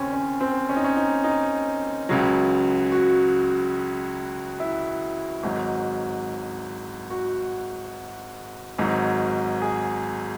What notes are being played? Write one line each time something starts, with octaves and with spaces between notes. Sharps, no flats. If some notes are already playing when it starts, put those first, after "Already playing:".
Already playing: D#2 C#3 C4 C#4
C#4
C4
C#4
D#4
C#4
D#4
D#4
C#2 C#3 F#3
F#4
E4
G#1 G#2 F#3
F#4
G#1 G#2 F#3
G#4